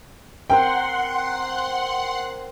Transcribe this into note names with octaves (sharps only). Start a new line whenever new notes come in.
C4 A#4 C5 F#5 G5 C6